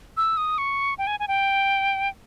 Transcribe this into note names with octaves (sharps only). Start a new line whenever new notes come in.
E6
D#6
C#6
G5
G#5
G#5
G5